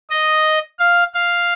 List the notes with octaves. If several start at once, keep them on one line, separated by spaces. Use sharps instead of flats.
D#5
F5
F5